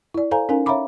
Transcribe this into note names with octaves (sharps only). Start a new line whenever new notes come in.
E4 D5
A4 C5 F5 G#5 A#5
C#4 D#4 A#4 F5 G#5
C#5 E5 F5 A#5 B5 D6